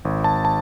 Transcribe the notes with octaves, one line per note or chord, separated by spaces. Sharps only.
G#1
A5
A5